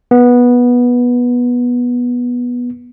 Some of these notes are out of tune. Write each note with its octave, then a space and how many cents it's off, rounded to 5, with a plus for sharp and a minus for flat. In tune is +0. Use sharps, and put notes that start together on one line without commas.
B3 -15